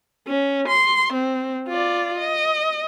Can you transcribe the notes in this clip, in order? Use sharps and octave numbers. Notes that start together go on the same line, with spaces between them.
C#4
C6
C4
F4 D5
D#5